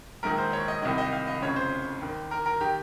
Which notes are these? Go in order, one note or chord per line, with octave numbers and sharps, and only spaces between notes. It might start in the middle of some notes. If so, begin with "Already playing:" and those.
A#1 G#2 D#3 A#4
C5
C#5
D#5
C2 C3 D#3 D#5
D#5
F5
D#5
F1 F2 C#3 C#5
C5
D#2 D#3
A#4
A#4
D#3 G4